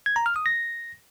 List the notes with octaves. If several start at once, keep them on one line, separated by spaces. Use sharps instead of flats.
G#6
A#5
F6
D#6
A#6